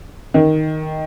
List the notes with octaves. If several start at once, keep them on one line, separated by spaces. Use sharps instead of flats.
D#3